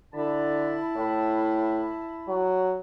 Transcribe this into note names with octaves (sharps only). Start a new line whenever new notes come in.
D3 E4 A5 B5
A2
F#3